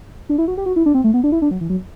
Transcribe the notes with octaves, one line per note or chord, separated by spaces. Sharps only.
D4
E4
F#4
G4
F#4
E4
D4
C4
A3
B3
D4
E4
D4
F#3
E3
F#3